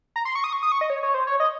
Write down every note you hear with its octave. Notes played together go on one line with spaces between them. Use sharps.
A#5
C6
C#6
D#6
C#6
D#6
C#6
D#5
C#5
C#5
C5
C#5
D#5